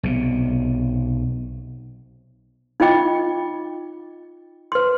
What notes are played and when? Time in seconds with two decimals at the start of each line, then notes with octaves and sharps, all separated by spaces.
0.03 B1 C3
2.80 D#4 F4 D#5 G5 D6
4.72 B4 C6